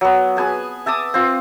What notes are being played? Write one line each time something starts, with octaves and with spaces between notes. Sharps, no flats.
F#3 B3
G#4 B4 G#5 A5
E5 A5 D6 D#6
C4 F4